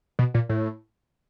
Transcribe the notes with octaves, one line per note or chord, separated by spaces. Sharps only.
B2
A#2
A2